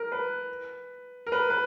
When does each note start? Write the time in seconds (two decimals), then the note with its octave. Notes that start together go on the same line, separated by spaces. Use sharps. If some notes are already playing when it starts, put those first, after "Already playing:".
Already playing: A#4
0.12 B4
1.27 A#4
1.32 B4
1.50 B4